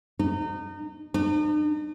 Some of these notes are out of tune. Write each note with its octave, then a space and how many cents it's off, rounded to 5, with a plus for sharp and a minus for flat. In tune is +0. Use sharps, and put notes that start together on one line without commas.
D#4 -30
D#4 -45